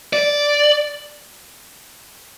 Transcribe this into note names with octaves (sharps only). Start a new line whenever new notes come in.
D5